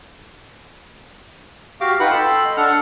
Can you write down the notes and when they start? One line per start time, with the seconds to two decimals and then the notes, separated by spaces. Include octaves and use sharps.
1.81 F#4 G4 F5 D6
2.00 D#4 F4 B4 F#5 G5 B5
2.11 A4 G5 B5 C6 E6
2.45 D#5
2.57 D4 A4 F#5 F6